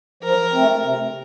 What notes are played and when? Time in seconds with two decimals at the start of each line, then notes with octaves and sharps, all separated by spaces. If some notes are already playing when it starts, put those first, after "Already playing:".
0.23 F3 A#4
0.53 A3 C4
0.83 C3